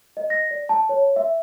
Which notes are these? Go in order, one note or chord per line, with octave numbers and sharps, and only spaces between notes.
D#5
A#6
D5
A5
C#5
E5